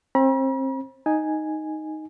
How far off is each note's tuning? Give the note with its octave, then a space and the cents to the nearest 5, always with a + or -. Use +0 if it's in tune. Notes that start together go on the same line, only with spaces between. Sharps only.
C4 +30 B5 -45
D#4 +0 G#5 +0